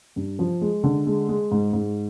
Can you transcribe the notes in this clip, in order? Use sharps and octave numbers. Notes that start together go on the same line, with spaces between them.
G2
F3
G#3
D3
G#3
G#3
G#2
G#2